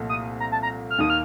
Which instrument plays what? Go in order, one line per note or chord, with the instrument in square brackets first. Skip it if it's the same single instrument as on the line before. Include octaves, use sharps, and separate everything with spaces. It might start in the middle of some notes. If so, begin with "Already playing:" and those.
Already playing: [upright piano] C2 A#2 F3 A3
[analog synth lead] D#6
A#5
A5
A#5
F6
[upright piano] D#2 D#3 A#3 [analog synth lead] D#6
[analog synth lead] F6